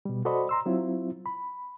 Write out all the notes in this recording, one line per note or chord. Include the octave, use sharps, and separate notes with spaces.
B2 G3
F#4 A4 C5 D5 D#5 B5
A#5 C6 E6
F#3 C4 E4 F4
B5